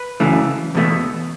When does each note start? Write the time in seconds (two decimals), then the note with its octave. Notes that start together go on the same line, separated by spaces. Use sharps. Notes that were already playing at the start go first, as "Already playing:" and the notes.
Already playing: B4
0.20 F#2 C#3 E3 A3
0.75 E2 B2 A3